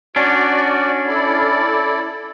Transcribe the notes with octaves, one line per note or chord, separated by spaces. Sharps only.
C#4 D4 F#4 D5
E4 A4 D5